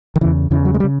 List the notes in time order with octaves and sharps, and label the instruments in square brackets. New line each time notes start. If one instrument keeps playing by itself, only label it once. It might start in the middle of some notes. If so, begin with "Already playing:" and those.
[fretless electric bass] D#3
C#3 E3
E2
E2 C#3 E3
F#3
G#3
G3
C#3